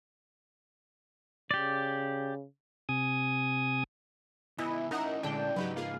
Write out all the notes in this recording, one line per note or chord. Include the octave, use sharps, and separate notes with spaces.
C#3 G4 D5
C3 G#5 D#6
C#2 E3 B3 E4 D#5
C#4 D#4 E4 A#4 E5 F#5
A#2 D3 G#3 D4 A4 G5
G#2 C#3 F#3 D#4 F#4 G4 B4
A#3 F4 G#4 F5